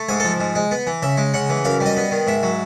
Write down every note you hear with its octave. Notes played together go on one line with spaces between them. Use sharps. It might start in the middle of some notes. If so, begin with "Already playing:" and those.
Already playing: A3
G#2 G#4
F3 A4
G#2
G#3
B3
E3
C#3 E5
G#3
C#3 F#5
E3
F#2 F5
G3
D#5
B3
D#3
G#2 E5
F#3